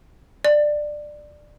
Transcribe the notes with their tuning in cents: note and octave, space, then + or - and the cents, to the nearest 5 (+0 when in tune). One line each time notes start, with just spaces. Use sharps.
D5 +15